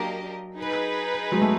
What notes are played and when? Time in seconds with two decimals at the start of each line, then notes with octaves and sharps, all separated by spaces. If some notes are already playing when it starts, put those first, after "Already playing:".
Already playing: F#3 A#3 D4 G4 A#4 D#5
0.57 D#4 G#4 B4
1.32 F#3 G#3
1.42 A3